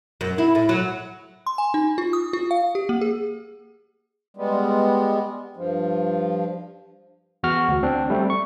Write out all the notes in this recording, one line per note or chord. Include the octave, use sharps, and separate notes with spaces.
F#2
E4
A2
F#3
C6
G#5
D#4
F4
D#6
F4
F5
G4
A#3
G#4
G3 G#3 B3
G2 F3
E2 F#4 F6
D2
C4 D4
G3 A3 C4
C#6